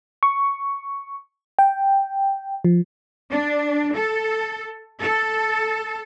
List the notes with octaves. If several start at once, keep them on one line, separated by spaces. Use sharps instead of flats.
C#6
G5
F3
D4
A4
A4